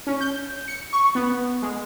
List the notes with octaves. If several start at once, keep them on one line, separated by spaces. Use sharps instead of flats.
C#4
G6
C#7
C#6
B3
G#3